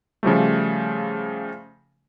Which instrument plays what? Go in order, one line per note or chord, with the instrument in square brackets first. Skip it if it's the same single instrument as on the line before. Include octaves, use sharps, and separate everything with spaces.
[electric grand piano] C#3 F3 G3 A3